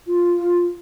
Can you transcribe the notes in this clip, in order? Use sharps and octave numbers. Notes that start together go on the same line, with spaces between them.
F4